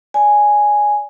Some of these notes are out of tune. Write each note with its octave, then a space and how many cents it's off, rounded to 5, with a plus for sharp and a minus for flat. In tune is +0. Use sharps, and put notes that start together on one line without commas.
D5 -20 G#5 +0